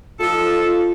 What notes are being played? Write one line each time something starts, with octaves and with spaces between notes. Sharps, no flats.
F3 D#4 F4 A4